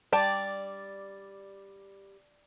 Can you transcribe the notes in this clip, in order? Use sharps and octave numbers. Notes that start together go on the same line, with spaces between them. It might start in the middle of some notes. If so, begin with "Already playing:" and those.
G3 D5 G5 A5